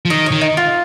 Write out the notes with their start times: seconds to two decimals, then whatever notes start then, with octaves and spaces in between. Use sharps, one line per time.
0.05 F3
0.10 D#3 D#5
0.26 C#5
0.32 D#3
0.41 D#4
0.57 F4